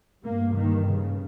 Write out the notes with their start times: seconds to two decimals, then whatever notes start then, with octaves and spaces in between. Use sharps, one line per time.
0.23 G2 A#3
0.55 D#3
0.87 C#3